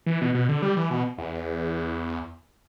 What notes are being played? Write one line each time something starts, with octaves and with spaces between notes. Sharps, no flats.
E3
B2
B2
D3
G3
E3
B2
E2